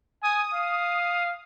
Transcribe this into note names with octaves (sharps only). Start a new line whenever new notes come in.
G#5 D#6
F5